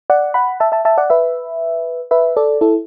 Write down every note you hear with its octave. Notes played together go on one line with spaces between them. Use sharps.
D5 F#5
F#5 B5
E5 A5
E5 A5
E5 A5
D5 F#5
B4 E5
B4 E5
A4 D5
E4 A4